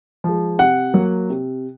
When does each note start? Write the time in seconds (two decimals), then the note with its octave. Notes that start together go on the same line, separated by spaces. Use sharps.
0.24 F3 G#3
0.59 C3 F#5
0.94 F#3 A#3
1.29 C3